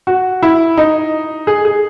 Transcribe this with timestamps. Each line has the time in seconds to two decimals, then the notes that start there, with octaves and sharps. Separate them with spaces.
0.07 F#4
0.43 E4
0.77 D#4
1.47 G#4
1.65 G#4